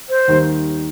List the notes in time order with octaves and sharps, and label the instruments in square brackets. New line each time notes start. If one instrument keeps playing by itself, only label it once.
[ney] C5
[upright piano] D#2 D#3 G3